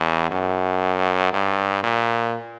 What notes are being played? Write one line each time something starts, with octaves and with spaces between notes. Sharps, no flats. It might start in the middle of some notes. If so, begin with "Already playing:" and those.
Already playing: E2
F#2
G2
A#2